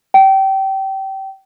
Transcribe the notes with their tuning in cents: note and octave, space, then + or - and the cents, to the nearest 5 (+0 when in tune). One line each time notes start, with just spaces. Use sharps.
G5 -25